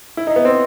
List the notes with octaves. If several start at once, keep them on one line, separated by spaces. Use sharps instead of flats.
E4
D#4
B3
C4